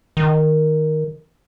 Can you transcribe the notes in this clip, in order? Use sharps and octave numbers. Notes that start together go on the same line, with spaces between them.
D#3